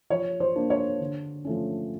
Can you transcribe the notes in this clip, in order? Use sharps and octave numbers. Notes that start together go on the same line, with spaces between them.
F3 C#5
C5
A#3 D4
C#5
D3
F3 A3 C#4